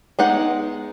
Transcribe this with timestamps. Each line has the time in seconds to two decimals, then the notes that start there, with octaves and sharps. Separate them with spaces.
0.19 G#3 B3 D#4 F#5